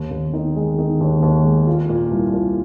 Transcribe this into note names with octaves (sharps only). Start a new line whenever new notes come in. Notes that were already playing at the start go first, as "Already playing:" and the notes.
Already playing: D#2
D#2
D#3
G#3
D#3
D#2
D#2
G#3
F4
A#2
C2
A#2